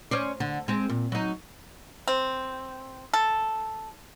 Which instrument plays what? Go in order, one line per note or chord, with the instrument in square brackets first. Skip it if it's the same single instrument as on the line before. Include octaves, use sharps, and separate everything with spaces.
[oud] C#4 C5 D5
D3
G#3 C4
A#2
F#3 D#4
[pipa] C4
A4